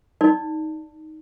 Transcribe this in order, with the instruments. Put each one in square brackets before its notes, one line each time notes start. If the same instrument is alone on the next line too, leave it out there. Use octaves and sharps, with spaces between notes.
[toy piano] D#4 D5